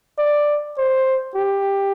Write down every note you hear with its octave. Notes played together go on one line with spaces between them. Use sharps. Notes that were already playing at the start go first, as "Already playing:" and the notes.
D5
C5
G4